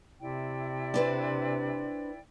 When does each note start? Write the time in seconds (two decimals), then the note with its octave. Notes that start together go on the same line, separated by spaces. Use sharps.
0.21 C3 E4 D5 G5
0.94 D4 B4 C5